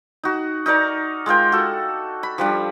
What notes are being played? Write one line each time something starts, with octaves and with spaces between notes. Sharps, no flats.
D#4 F#4
D#4 A#4 D5 A#5
G#3 F4 A#4 G5
F#4 A4
B5
F3 G3 D4